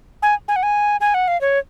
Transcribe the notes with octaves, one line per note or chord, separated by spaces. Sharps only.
G#5
G#5
F#5
G#5
G#5
F#5
F5
C#5